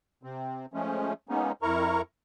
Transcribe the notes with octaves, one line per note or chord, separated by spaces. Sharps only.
C3 C4
F3 G#3 A3 C#4
G#3 A#3 B3 C#4 D#4
F2 E4 A#4 A#5 C#6